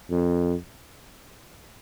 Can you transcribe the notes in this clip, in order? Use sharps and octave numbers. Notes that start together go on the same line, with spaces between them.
F2